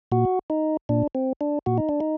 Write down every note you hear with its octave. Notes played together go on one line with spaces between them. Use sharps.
A#2 F#4
D#4
A#2 D4
C4
D4
A#2 F#4
D#4
D4
D#4